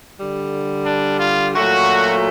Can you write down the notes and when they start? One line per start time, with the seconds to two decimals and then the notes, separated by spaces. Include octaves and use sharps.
0.17 D3 G3
0.86 D4
1.19 F4
1.54 A#2 F#3 A3 F#4